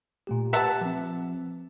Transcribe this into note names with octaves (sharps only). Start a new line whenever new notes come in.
A#2 A3 G4
G4 B4 E5 F#5 A5
F3 C4